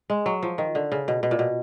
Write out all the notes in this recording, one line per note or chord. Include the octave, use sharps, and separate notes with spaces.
G#3
F#3
F3
D#3
D3
C#3
B2
B2
A#2
B2